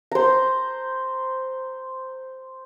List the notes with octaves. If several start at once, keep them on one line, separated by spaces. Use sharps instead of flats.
C5 A#5